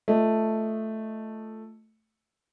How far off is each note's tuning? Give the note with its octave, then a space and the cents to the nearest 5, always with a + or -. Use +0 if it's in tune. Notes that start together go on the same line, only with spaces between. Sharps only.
A3 +0 F4 +0 D#5 +0